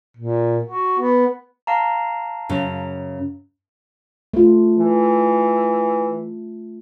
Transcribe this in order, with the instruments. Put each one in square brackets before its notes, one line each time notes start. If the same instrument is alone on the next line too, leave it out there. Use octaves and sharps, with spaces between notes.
[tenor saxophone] A#2
F#4
B3
[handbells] F5 A5 A#5
[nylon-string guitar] F#2 C#3
[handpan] A3 F4
[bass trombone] E3